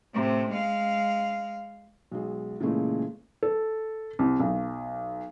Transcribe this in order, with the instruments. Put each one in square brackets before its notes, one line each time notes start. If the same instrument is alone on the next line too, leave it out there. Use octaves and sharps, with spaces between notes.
[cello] A2 C3
G#3 F5
[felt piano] B1 G#3
A#2 C#3 E3 G#3 A3
A4
C2
B1